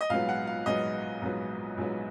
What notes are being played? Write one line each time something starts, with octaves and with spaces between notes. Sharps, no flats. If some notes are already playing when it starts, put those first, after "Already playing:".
D#5
A#1 G#2 F#3 B3 F5
F#5
F5
A#1 G#2 F#3 B3 D#5
A#1 G#2 F#3 B3
A#1 G#2 F#3 B3